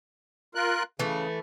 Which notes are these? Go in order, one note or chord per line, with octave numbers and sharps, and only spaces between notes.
F4 A#4 F#6
C#3 E3 A3